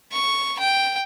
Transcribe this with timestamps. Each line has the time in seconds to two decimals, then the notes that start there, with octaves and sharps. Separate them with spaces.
0.12 C#6
0.59 G5